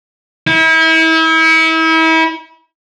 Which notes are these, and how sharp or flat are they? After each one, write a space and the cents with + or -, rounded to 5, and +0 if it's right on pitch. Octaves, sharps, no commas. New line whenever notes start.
E4 -35